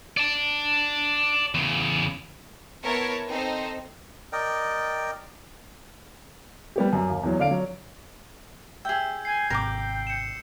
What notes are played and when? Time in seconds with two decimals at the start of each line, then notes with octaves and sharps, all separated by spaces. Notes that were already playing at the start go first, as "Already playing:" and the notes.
0.17 D5 A5
1.55 E2 C#3
2.84 B3 E4 A#4 C#5 A5
3.30 C4 D#4 A4 C5
4.33 A#4 D5 D#5 G5
6.76 G3 B3 G4
6.93 F#2
7.10 D#2
7.23 E2 F#3
7.39 D3 D5 F5 D7
7.51 F#3
8.85 G#4 E5 G5 E6 G6
9.25 G#5 C7
9.50 G#1 C3 A#4 G5 D6
10.07 C#7 E7